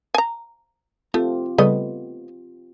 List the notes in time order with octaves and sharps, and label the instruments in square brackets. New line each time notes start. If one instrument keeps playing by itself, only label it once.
[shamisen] G#5 A#5
[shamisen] A3 [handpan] C4 F4 G4
[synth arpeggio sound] C#3 G3 [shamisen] A3 B3 D#5